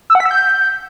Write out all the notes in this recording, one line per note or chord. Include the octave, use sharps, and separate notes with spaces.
E6
F#5
B6
E6
G6